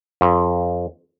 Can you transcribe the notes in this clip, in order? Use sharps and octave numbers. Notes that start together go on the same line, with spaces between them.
F2